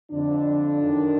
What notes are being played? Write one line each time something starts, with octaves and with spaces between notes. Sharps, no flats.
F2 D3 D4
F#2 D#3